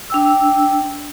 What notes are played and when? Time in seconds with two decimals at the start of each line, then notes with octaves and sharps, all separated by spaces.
0.10 D4 G5 E6